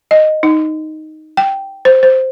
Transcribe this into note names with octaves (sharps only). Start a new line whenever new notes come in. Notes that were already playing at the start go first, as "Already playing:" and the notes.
D#5
D#4
G5
C5
C5